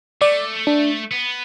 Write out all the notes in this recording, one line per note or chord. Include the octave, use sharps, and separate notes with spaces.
A3 D5
D4
B3